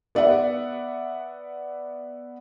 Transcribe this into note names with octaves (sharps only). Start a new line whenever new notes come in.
B3 D5 E5 F#5